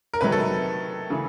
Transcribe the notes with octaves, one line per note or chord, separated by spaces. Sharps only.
A#4
C3 D#3 F#3 A3 B4
A4
C#3 E3 A3